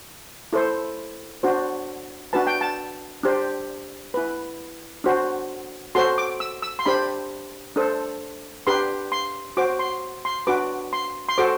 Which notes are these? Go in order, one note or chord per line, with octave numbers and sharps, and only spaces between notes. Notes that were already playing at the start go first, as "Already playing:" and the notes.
E4 A4 C5
D4 F#4 C5
D4 F#4 B4 A5
G5
A5
D4 G4 C5
E4 B4
D4 F#4 C5
F#4 A4 C5 C6
D6
E6
E6
C6
D4 G4 C5 B5
D4 A4 C5
D4 G4 B4 C6
C6
F#4 C5 D6
C6
C6
D4 F#4 B4 D6
C6
C6
F#4 A4 C5 D6